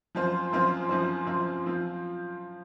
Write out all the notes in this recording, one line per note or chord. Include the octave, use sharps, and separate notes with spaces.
F#2 F3 C4 F4 C5
F#2 F3 C4 F4 C5
F#2 F3 C4 F4 C5
F#2 F3 C4 F4 C5
F3 C4 F4